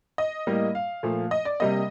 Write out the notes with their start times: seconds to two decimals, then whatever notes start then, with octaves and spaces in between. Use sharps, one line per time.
0.18 D#5
0.47 A2 G3 A#3
0.75 F5
1.03 A#2 F3 A3
1.31 D#5
1.45 D5
1.60 C3 G3 A#3 D#5